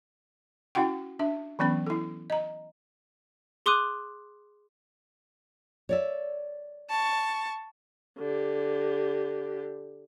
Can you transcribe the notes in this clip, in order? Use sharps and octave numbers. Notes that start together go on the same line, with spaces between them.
C#4 E4 F#4 F#5 G5
D4 E5
E3 F#3 B3 C#4 B5
E4 A4
D#5 A#5
G#4 C6 D6 D#6 F#6 D#7
C#5 D5 E5
A5 C#6
D3 G4